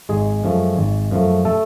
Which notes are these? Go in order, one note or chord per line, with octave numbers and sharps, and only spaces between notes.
G#1 G#3 G#4
F#2 F3 A3
G#1
F#2 F3 A3
A3 A4